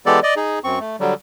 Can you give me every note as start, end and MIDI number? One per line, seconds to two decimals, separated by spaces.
0.06 0.20 52
0.06 0.20 56
0.06 0.20 59
0.06 0.20 67
0.06 0.20 69
0.06 0.20 74
0.23 0.34 74
0.23 0.34 75
0.37 0.59 63
0.37 0.59 68
0.64 0.79 42
0.64 0.79 60
0.64 0.79 85
0.80 0.96 57
1.00 1.14 50
1.00 1.14 54
1.00 1.14 55